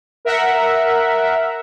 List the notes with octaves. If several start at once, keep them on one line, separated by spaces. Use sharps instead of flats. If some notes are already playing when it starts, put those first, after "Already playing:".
A#4 E5 F#5